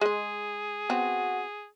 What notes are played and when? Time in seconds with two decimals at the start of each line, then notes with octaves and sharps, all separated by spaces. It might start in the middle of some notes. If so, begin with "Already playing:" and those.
0.01 G#3 G#4 D#5
0.90 B3 C4 F#4